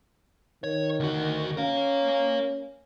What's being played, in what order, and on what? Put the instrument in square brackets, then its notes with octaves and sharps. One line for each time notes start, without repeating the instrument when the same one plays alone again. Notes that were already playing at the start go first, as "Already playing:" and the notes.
[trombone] D#3 [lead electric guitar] C#5
[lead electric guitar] D2 F#4
[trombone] C#4 [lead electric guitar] A#4 F5